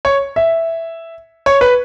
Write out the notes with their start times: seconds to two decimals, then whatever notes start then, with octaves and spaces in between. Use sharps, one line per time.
0.05 C#5
0.36 E5
1.46 C#5
1.61 B4